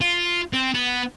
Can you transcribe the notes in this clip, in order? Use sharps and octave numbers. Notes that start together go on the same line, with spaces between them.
F4
C4
B3